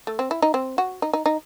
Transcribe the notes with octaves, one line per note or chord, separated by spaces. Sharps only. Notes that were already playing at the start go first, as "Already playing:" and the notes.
A3
C4
E4
D#4
C4
F#4
D#4
D#4
D#4